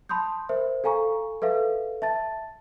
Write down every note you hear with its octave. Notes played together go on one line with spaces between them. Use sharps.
A5 B5 C6 D#6 G6
A#4 C5 E5
A4 F5 G#5 A#5 C#6
A4 B4 E5 F5
E5 A5 A6